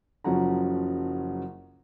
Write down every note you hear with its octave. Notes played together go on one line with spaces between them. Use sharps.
F#1 C#3 F3 F#3 F#5 A#5